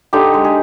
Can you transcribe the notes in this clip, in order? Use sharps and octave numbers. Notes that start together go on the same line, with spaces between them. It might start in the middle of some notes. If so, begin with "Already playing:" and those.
D3 D#4 G4
G#3
G#4